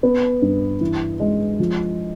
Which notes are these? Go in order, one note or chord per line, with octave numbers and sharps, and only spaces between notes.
B3
G2
E3
G#3
F3